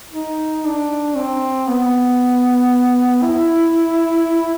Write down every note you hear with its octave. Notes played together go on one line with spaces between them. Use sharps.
D#4
D4
C4
B3
E4